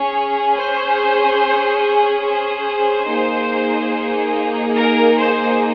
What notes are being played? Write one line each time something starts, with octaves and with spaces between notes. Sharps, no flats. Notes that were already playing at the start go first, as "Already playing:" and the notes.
Already playing: C#4 G#4 C#5
C5
C5
A#3 D#4 G#4
A#4
C5